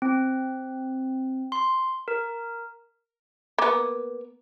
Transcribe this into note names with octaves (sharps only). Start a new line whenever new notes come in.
C4
C6
A#4
A#3 B3